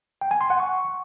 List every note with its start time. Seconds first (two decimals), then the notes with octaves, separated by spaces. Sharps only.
0.21 G5
0.31 G#5
0.41 C6
0.50 F#5
0.60 C#6